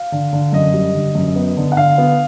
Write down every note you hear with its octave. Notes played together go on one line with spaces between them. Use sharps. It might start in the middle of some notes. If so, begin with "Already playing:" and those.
Already playing: F5
D3
D3
F#2 D#5
G3
D3
F#2
B3
D3
F#5
D3 F5
B3